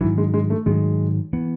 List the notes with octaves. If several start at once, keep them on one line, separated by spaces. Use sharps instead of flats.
G#2 D#3 E3 F#3
G#3
G#3
A3
G#2 D#3 F#3 G#3
E3 B3